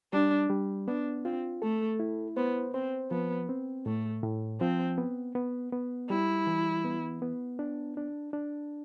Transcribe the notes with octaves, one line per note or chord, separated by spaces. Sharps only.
G3 D4
G3
B3 D4
C4 F4
A3 A4
E4
B3 C5
C4 C5
F3 B3
C4
A2 A3
A2
F3 C4
B3
B3
B3
G3 E4
E3
B3
B3
D4
D4
D4